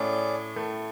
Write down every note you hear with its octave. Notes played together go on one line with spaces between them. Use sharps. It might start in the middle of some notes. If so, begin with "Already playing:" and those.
Already playing: A2 A3 C#4 G#4 D5
A2 A3